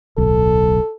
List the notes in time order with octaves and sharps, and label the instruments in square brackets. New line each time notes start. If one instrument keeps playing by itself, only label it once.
[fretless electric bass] D1 B1 [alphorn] A4